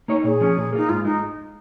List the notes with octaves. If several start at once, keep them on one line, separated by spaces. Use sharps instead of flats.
A#3 D#4 C#5
A#2 G#4
F3 C#4
A#2
A#3 D#4 F4
G#2 F4
G#3 D#4